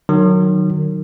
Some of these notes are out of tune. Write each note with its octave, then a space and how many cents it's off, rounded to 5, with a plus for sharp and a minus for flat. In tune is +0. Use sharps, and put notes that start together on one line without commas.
D#3 -30 F#3 +0